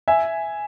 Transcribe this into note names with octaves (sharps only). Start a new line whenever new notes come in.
E5 G#5